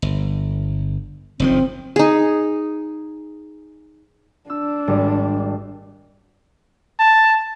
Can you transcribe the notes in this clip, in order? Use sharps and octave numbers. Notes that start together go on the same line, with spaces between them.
G1
F#1 D#3 F3 C4
D#4 G#4
D4 E6
G#1 G3
A5